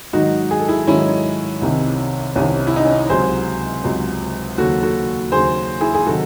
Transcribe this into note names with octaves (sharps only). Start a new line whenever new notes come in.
G#2 D#3 F#3 D#4 F#4
G#4
A4
E4 G#4
G#2 D#3 F#3 C#4 E4
C2 C3 D#3
C2 C3 D#3 C#4
E4
D#4
C#4
C#2 C3 F#3 G#4 C5
C#2 C3 F#3
D#2 C#3 F#3 F#4 A4
F#4 A4
D#2 C#3 F#3 G#4 C5
E4 G#4
G#4
C3 D#3 F#3 F#4 A4